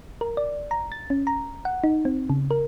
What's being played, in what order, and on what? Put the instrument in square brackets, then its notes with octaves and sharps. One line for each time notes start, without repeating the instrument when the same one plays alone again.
[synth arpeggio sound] A#4
D5
A#5
A6
C#4
A#5
F#5
D#4
C4
C#3
A#4